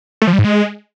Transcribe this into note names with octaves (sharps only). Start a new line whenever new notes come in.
A3
F3
G3
G#2
G#3